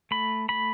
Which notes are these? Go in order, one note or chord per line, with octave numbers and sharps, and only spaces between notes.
A3 B5
A3 B5